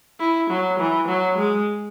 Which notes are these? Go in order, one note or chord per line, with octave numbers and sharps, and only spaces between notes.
E4
F#3
E3
F#3
G#3